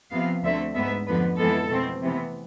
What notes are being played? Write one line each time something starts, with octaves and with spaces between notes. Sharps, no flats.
C3 F3 B3 F5
D2 D3 A3 C4 E5
G#2 G#3 B3 E5
F2 D3 F3 B3 B4
F2 E3 G#3 B3 A4
B2 A3 C4
C3 E3 B3